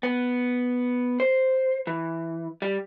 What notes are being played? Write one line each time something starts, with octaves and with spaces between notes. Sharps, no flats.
B3
C5
E3
G3